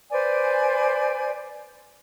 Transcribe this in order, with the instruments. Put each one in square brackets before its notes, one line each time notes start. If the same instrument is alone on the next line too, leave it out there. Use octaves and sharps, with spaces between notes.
[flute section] B4 C5 D5 G#5